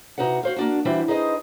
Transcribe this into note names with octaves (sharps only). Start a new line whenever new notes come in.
C3 D#4 F#4 B4 F#5
F#4 C5 F5
A#3 D4 F#4
E3 G3 C4 F#4 E5
D#4 G#4 B4 C5 D#5